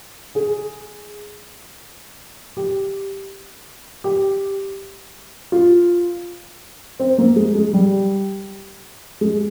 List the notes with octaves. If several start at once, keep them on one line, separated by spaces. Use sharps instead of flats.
G#4
G4
G4
F4
C4
A#3
G#3
G#3
G3
G#3